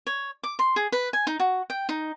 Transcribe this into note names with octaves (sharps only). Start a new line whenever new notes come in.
C#5
D6
C6
G#4
B4
G#5
D#4
F#4
G5
D#4